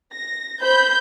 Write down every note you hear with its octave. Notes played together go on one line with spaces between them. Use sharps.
A#6
C5 B5 G6